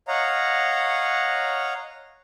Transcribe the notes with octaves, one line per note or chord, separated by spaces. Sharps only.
C#5 D#5 F5 F#5 A#5